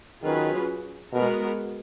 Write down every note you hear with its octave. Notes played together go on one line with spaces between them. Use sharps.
D#3 F#3 C#4 F4 G#4 B4
B2 G#3 B3 F#4 A#4